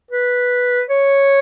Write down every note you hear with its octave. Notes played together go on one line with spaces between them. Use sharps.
B4
C#5